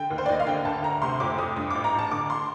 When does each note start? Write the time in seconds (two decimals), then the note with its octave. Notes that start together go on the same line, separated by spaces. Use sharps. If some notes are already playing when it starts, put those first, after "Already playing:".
Already playing: D3 G5
0.10 D#2
0.18 C5
0.26 D5
0.29 D#2 D#5
0.40 F5
0.47 D3 G5
0.65 D2 A5
0.84 D2 A#5
1.02 C3 C6
1.20 F2 D6
1.38 F2 D#6
1.56 G2 D#6
1.71 A1 D6
1.84 A#5
1.94 A1 A5
2.11 D3 D6
2.30 C6